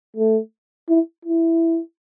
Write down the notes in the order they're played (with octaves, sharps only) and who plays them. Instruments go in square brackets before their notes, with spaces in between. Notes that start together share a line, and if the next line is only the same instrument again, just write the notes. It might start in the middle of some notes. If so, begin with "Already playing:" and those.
[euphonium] A3
E4
E4